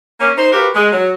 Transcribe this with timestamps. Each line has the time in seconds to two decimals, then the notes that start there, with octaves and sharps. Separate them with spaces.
0.20 A#3 C#4
0.38 D#4 C5
0.52 F#4 G4 A#4 B4 F5
0.75 G#3
0.92 F#3